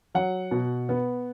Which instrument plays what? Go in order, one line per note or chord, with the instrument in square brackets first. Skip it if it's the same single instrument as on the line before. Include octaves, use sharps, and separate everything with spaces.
[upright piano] F#3 F#5
B2
B3